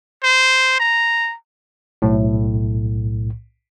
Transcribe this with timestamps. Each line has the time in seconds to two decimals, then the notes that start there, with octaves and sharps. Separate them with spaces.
0.23 C5
0.80 A#5
2.02 B1 A2